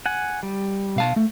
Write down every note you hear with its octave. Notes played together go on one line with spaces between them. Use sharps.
F#5 G#5
G3
B2 F5 A5
A3